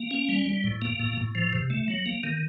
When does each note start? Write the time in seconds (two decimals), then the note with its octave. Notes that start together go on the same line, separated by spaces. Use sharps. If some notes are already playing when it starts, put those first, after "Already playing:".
Already playing: A#3
0.11 C#4
0.29 G3
0.46 G3
0.64 A2
0.82 A#3
0.99 A2
1.17 A2
1.35 F3
1.53 C3
1.70 A3
1.88 F#3
2.06 A#3
2.24 D#3